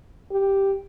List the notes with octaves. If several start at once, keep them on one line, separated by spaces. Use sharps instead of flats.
G4